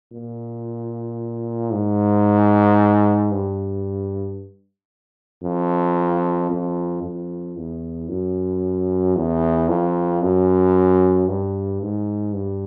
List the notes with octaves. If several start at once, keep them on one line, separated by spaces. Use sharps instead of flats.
A#2
G#2
G2
F2
F2
F2
E2
F#2
E2
F2
F#2
G2
G#2
G2